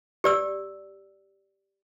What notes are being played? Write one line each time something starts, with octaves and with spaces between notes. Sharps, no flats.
G4 D5 E6